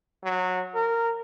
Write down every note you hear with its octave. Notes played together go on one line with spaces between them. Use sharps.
F#3
A#4